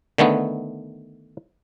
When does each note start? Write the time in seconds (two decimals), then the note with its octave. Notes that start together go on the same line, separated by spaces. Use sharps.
0.18 D3 D#3 A3 B3